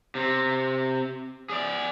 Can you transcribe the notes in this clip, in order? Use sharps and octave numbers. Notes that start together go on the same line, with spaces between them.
C3
G#4 D5